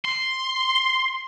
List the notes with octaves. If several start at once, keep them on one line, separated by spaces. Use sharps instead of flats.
C6